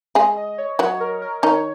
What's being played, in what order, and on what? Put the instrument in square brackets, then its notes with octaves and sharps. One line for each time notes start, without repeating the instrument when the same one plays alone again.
[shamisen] G#3 G#4 [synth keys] D#5
[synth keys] D#5
C#5
[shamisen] F#3 F#4 [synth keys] C#5
[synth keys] A#4
A#4
[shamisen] D#3 D#4 [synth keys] C#5